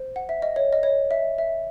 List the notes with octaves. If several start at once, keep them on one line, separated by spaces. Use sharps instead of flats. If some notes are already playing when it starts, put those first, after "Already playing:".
Already playing: C5
F#5
E5
D#5
C#5
D#5
C#5
E5
E5